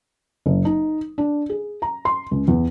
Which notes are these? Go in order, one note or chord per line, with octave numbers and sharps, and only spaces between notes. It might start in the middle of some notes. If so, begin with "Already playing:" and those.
F#1
D#4
D4
G#4
A#5
C6
C#2
E2